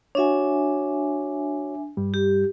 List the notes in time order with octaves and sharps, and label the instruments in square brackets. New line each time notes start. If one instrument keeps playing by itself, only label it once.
[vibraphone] D4 E5 G#5 [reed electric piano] F#4 C#5
[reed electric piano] G2 G3
[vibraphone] G4